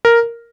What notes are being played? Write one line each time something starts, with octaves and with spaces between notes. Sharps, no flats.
A#4